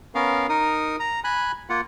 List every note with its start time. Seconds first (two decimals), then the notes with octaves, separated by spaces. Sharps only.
0.15 B3 C#4 A#4 F5
0.49 D#4 A#4 D#6
1.00 A#5
1.24 G#5 B5 F#6
1.69 A#3 F4 F#5